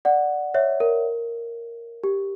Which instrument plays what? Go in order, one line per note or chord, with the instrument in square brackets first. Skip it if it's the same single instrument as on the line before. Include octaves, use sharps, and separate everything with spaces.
[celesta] D5 F#5
C#5 E5
A#4
G4